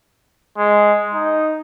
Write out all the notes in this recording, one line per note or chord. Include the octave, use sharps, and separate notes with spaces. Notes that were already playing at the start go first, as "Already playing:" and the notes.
G#3
D#4